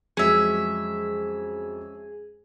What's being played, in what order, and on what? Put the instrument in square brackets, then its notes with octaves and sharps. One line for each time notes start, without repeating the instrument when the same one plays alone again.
[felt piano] F2 F#3 G#3 [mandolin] C#4 E5 [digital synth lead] G#4